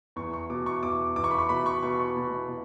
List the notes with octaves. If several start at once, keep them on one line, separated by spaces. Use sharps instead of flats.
E2 C#6
C#6
B2 D6
C#6
E2 D6
E2 D6
C#6
B5
C#6
B2 B5
C#6
B2 C#6
C#6
B2
B2